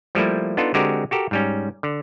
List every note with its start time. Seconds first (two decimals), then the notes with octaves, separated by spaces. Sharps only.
0.15 F3 G3 A3 A#3 E4
0.57 B3 D4 D#4 F4 A4
0.74 D3 G#3 C4 F#4 G4 A#4
1.11 F#4 G4 A4 A#4
1.31 G#2 G3 C#4
1.83 D3